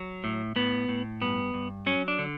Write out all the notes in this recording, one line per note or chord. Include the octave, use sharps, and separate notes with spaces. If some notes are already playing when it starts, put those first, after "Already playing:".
Already playing: F#3
A2
A2 B3
A2
G2 B3
G2
F#3 C#4
D4
D3